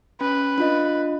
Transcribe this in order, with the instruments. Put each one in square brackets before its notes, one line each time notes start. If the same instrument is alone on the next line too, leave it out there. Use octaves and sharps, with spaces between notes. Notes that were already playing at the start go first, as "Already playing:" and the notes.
[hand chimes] C#4 [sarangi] B4
[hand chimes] D4 F4 D#5